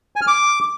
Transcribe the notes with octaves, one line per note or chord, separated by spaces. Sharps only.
G#5
F6
D6